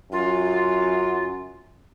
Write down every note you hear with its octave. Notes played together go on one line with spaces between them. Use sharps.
F#2 F4